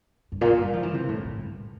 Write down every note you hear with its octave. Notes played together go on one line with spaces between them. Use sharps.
G2
A#2
G3
F3
E3
C3
A2
A2
G2